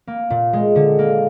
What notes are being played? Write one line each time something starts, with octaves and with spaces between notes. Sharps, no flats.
A#3
A#2
G#3
D3
A#3